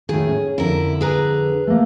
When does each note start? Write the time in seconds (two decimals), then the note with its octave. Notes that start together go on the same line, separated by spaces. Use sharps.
0.09 A2 D#3 G#4
0.29 C#4
0.58 F2 D3 E4 A#4
1.01 G#4 B4 A#5
1.67 A3 A#3